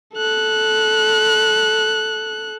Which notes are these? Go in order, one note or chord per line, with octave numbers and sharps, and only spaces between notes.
A4 F#6